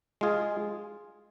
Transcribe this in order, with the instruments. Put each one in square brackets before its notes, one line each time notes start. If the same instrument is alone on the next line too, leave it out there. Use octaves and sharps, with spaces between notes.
[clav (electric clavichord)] G#3 F4 G#4